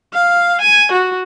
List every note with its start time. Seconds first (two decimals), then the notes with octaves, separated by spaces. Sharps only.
0.14 F5
0.62 G#5
0.92 F#4